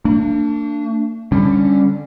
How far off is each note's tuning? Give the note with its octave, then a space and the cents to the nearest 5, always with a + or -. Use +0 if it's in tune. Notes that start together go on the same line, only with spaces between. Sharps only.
A#3 -45 D4 +0
D3 +0 G3 +20 C#4 +0